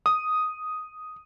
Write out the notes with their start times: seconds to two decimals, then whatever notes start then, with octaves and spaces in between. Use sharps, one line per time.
0.06 D#6